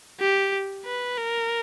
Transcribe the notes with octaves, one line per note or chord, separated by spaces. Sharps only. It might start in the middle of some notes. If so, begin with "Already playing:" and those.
G4
B4
A#4